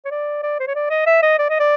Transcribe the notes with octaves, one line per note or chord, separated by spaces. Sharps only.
C#5
D5
D5
C5
C#5
D5
D#5
E5
D#5
D5
D#5
D5